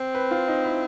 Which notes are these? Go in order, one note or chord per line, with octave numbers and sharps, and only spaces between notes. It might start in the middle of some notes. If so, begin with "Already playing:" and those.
Already playing: C4
B4
F4
D#4
E4